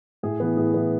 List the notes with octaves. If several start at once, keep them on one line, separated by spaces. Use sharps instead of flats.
A2 G#4
E3 B3
A2 G#4
E3 B3